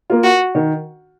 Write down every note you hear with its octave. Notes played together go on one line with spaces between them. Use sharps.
A#3 F4
F#4
D#3